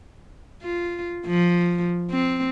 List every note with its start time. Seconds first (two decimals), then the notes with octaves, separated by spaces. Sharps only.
0.63 F4
1.27 F3
2.11 C4